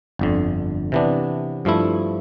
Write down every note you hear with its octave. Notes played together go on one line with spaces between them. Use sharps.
G1 F2 D3
C3 E3 B3 D4
G2 F3 A3 E4